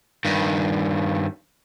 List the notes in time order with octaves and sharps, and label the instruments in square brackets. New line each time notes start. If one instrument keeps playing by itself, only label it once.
[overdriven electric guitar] G2 D#3